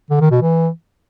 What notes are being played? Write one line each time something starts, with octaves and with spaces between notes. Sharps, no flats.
D3
D#3
B2
E3